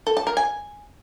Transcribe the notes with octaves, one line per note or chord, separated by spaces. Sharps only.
A4
A5
A#4
G#5